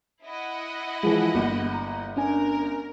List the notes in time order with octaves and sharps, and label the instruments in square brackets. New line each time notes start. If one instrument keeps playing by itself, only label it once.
[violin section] E4 D#5 F#5
[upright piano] E3 F3 [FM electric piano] G#3 G#4
[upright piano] G1 [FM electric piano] A#3
[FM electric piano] A#5
[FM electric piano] C#4 D4 G#5 [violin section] A#4